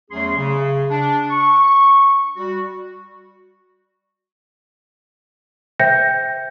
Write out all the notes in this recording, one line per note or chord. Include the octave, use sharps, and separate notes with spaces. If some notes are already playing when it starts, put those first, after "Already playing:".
E2 F#3 A3 C#4 G#4 C6
C#3
D4
C#6
G3 F#4
C5 E5 G5 G6 A#6 C#7